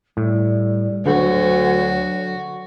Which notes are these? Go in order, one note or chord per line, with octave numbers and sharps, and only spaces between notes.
A2 G3
D2 D3 F#3 F#4